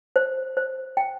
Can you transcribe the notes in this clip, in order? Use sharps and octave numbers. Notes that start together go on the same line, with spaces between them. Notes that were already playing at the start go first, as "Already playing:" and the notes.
C5
C5
G5